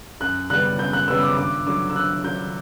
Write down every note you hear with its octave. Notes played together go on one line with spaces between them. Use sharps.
F#2 F#6
C#3 G3 B3 F#6
F#2 G6
F#6
C#3 G3 B3 E6
D6
G2 D6
D3 F#3 D6
E6
G2 F#6
D3 F#3 G6